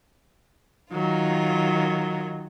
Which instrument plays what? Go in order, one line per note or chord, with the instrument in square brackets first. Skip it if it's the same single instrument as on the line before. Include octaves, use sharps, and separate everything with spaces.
[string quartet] D#3 F#3 F4